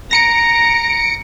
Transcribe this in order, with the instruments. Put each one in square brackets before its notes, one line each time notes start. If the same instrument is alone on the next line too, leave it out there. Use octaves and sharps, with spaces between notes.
[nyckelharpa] A#5 [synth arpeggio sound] A#6 C#7 D7